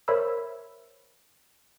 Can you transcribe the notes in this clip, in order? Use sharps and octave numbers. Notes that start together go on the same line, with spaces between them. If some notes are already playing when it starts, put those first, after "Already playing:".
A#4 C5 C#5 E5 B5 E6